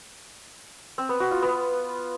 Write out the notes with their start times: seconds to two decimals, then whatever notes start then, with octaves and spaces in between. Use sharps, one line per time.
0.98 C4
1.09 B3
1.20 F#4
1.31 F4
1.42 B3